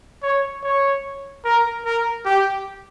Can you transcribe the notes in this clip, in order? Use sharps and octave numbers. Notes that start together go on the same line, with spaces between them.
C#5
C#5
A#4
A#4
G4